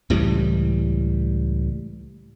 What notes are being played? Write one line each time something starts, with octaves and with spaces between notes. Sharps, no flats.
C#2 A2 E3 G3